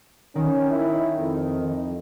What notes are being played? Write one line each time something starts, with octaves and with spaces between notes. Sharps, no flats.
D#3 C#4
E4
F2